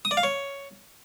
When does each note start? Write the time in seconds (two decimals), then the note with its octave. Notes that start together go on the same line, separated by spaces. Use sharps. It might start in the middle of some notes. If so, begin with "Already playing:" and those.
0.05 D#6
0.11 D5
0.17 F5
0.23 C#5